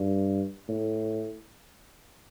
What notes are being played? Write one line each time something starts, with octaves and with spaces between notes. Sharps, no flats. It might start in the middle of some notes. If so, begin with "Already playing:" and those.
Already playing: G2
A2